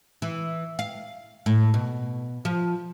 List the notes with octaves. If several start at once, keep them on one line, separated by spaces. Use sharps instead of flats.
E3
F5
A2
B2
F3